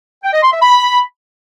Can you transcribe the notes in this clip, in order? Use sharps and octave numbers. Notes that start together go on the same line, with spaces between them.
G5
D#5
C6
E5
B5